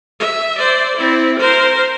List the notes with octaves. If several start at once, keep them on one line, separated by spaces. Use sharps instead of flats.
E5
C5 D5
C4 E4
A#4 C5